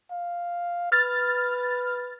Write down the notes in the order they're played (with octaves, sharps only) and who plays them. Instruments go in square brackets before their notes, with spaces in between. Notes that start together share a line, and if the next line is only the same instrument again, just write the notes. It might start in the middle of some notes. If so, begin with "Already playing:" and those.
[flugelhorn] F5
[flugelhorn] B4 [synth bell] F6 A6